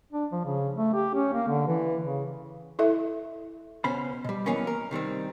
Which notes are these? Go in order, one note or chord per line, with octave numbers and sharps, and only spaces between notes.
D4
F3
C#3
A3
G4
C#4
A#3
D3
E3
C#3
E4 A4 E5
C#2 B2 B3 C#4 C5 B5
B2 G3
B1 A2 E3 A#3 B3 C#4
A#4
C3 D#3 G3 C4